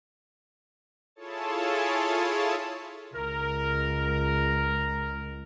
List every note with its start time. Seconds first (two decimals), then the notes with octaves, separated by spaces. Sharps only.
1.15 E4 F4 G#4 A4 C#5 A5
3.15 C#2 A#4